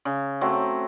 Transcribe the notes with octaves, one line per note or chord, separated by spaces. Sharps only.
C#3
F#3 A3 C4